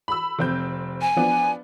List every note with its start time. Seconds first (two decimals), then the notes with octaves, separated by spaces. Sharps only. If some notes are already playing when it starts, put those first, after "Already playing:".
0.08 B5 E6
0.39 F1 C4 G6
1.01 G#5
1.16 F3 B3 D4